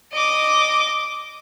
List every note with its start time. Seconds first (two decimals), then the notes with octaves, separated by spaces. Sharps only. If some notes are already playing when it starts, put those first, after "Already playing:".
0.13 D#5 D6